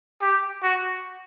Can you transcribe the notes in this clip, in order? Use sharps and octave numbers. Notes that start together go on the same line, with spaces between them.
G4
F#4